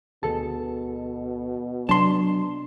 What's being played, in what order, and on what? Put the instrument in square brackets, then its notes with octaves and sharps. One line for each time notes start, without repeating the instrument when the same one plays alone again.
[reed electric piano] D2 A4 A5 [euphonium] B2 [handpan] G#4
[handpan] C3 B3 D4 [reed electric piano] F#3 [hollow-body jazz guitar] A5 C6